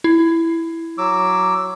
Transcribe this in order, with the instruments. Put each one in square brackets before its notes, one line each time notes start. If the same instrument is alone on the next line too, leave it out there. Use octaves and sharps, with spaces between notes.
[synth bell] E4
[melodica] F#3 D6 E6